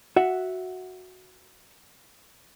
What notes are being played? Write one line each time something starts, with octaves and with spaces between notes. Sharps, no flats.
F#4 E5 F#5